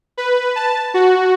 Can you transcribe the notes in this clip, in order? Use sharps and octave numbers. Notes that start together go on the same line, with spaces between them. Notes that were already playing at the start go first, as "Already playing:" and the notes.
B4
A5
F#4